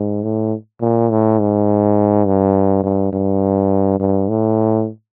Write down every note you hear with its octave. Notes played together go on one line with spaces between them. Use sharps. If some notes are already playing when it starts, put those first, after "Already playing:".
Already playing: G#2
A2
A#2
A2
G#2
G2
G2
G2
G2
A2